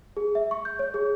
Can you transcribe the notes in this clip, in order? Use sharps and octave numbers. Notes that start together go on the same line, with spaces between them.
G#4
E5
C#6
G6
C#5
G#4